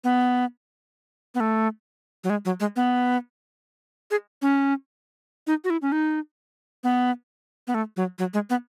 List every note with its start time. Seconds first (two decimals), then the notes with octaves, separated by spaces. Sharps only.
0.04 B3
1.35 B3
1.40 A3
2.24 F#3
2.30 G#3
2.45 F#3
2.60 G#3
2.76 B3
4.11 G#4
4.42 C#4
5.47 D#4
5.64 F#4
5.70 E4
5.82 C#4
5.92 D#4
6.84 B3
7.67 B3
7.74 A3
7.97 F#3
8.19 F#3
8.34 G#3
8.50 B3